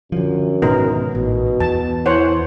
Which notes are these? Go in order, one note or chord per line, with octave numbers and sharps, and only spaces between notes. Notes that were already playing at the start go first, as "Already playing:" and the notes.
F#2 D3 F3
G#2 B2 D#3 B3 D#4 A#4
A1 B2
E2 A5
E3 C5 C#5 F#5